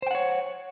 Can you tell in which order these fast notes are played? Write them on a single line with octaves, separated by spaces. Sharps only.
C5 G5 F#5 C#5